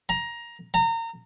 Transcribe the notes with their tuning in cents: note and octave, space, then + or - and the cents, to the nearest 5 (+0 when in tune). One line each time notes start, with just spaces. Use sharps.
A#5 +15
A#5 -30